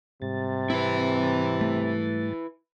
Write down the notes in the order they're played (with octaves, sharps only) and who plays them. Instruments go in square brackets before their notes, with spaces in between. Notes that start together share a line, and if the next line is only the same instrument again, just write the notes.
[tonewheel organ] G#2 G3 A6 [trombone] C3
[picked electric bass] C4 [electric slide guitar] E4 B4
[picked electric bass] A3